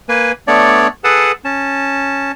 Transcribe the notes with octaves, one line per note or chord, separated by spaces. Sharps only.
A#3 B4 G#5
A3 B3 D4 C#5 D5
G#4 A4 B4 F#5 A5
C#4 A5